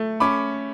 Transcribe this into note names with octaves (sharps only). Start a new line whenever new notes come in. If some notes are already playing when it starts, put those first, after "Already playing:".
Already playing: A3
C#4 B5 D6